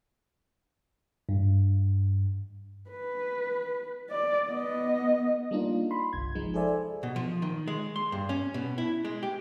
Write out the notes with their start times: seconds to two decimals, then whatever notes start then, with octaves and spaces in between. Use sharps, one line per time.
1.29 G2
2.90 B4
4.10 D5
4.48 B3 D#5
5.51 G3 A#3 D4 D#4 F4
5.91 B5 C6
6.13 G1 C2 G#6
6.35 F3 G#3 D#4
6.54 G#4 A4 C5 D5 E5 G#5
7.03 B2
7.16 F3
7.42 D#3
7.67 G#3
7.96 C6
8.12 G2
8.29 C#4
8.54 B2
8.78 E4
9.05 G#3
9.23 G4